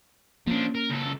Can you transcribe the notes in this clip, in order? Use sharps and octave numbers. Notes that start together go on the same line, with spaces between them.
F3 A#3 C#4 D4
A#4
C#2 A4